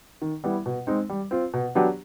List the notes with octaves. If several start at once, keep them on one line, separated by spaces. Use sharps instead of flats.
D#3
G3 B3 E4
B2
G#3 C4 D#4
G3
C4 F4
B2
F#3 B3 D4 G4